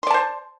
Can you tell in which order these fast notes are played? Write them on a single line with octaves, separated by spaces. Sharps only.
C6 D5 A5 C5